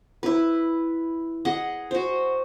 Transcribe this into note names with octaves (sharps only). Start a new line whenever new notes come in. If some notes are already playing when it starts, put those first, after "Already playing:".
E4 B4
G#4 D#5 F#5
F#4 C5